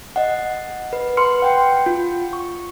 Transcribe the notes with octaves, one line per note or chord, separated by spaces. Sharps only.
D#5 F#5
B4
B4 C6 F6 C#7
F#5 G5
F4
C#6